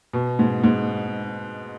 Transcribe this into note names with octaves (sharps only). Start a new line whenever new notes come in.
B2
G#2
G#2